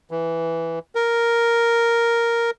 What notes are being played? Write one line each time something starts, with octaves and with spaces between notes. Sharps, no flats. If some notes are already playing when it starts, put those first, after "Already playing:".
E3
A#4